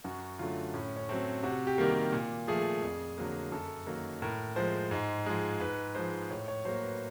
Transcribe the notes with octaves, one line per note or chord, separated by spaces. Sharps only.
F#2 F#4
D3 F#3 A3 F4
A2 C#4
C#4
F#3 A3 C4
C3 F#4
G4
D#3 G3 A#3
G4
A#2
F3 A3 G#4
F2
D3 F#3 A#3
F#2 A4
D#3 F#3 A#3
A2 A#4
F3 G#3 C5
G#2
F3 G#3
G#2 B4
F3 G#3 C5
A2 C#5
C#5
F#3 A#3 C5
B4